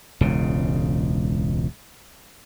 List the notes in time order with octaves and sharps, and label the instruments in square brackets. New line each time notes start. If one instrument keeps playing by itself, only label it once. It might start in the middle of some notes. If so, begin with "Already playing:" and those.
[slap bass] E1 C#2 G#2 C#3